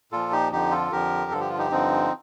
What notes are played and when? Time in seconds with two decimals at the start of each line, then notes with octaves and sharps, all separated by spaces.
0.12 A#2 F3 F4 A4
0.32 D#4 G4
0.52 F2 D3 F3 D#4 G4
0.71 F4 A4
0.92 F2 D3 F3 G4 A#4
1.31 G2 D3 F3 A4
1.40 G4
1.49 F4
1.58 D#4 G4
1.71 G2 D3 F3 C4 D#4